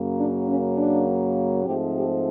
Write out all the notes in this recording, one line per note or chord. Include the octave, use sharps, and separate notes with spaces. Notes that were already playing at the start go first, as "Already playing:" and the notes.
Already playing: F#2 C#3 F#3 A#3
D4
C#4
D4
G#2 F3 A3 C4 G4
G4